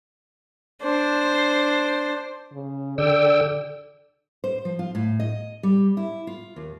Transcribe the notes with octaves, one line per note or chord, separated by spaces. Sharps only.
D4 C5
C#3
D3 D5 G5 E6
C5
F3
F4
A2
D#5
G3
E4
F4
D#2